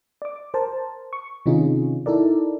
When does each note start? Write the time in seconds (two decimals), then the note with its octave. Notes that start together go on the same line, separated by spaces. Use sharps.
0.22 D5 D6
0.54 A#4 C5 A5
1.13 C#6
1.46 C3 D#3 C#4 D#4 F4 G#4
2.06 D#4 E4 A4 A#4 D5